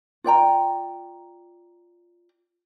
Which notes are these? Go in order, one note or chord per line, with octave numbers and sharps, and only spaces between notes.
F4 D5 G5 A#5